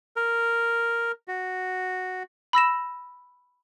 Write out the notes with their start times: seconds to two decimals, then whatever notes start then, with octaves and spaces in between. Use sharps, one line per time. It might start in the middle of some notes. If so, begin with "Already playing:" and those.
0.16 A#4
1.28 F#4
2.53 B5 E6 A#6 E7